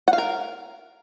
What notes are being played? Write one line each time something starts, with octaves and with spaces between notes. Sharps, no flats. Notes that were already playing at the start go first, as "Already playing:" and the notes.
F#5
F5
A#4